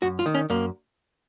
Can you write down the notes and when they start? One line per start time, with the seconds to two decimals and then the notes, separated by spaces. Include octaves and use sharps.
0.02 F#2 F#4
0.19 F4
0.26 D#3
0.34 C#4
0.50 F#2 A#3